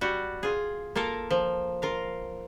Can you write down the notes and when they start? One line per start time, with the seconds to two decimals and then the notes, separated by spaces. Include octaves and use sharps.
0.01 G3 F#4
0.43 F4 G#4
0.96 A#3 F4 A4 A#4
1.30 F3
1.82 F4 A#4 F5